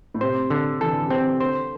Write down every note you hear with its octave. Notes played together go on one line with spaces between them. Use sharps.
A2
C3 C5
D3
E3 A4
D3
C3 C4
D3
D3 C5